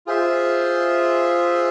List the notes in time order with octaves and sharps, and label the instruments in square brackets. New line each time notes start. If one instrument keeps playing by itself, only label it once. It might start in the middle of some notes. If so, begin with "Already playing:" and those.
[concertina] F4 G#4 C5 E5